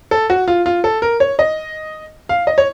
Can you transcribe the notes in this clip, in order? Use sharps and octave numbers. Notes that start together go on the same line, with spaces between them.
A4
F#4
F4
F4
A4
A#4
C#5
D#5
F5
D#5
C#5